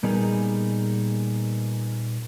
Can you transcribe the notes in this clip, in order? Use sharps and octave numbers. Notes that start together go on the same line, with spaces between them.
A#2 G3 B3 D#4 G#4 A#4